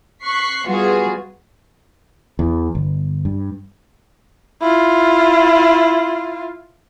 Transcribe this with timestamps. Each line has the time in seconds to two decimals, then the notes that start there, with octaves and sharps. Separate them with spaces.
0.24 C#6 F#6 B6 C7
0.67 G3 B3 F4 F#4 G#4
2.39 E2
2.75 G1
3.25 G2
4.62 E4 F4